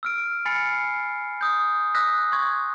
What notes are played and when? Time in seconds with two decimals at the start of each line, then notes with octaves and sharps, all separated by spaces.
0.03 E6 F6 D7
0.45 G#5 B5 F6 A6 C7 C#7
1.41 D#6 G6
1.94 D#6 E6 F#6 A#6 B6
2.32 C6 C#6 G#6